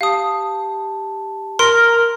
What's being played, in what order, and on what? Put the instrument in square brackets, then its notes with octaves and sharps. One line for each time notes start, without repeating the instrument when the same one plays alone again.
[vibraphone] G4 A5 [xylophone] F5 D#6
[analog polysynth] A#4 [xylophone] C6